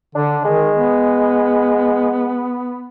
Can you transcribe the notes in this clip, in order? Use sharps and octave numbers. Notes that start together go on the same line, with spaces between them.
D3 D4
D#3 G#3
B3